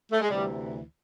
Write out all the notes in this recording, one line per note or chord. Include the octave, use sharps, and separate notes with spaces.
A3
G#3
D2 C3 E3 G3